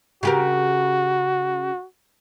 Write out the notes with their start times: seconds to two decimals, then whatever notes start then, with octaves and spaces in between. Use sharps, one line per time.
0.23 C#3 F#4 G4 A#4